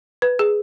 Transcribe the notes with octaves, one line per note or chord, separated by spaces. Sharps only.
B4
G#4